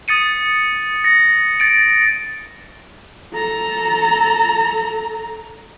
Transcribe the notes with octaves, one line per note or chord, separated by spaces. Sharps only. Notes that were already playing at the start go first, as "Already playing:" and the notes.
D#6 A6 C#7 D#7
A#6 C#7
A6 D7
A4 A#5